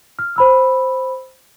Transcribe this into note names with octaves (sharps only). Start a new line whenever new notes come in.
F6
C5 B5 E6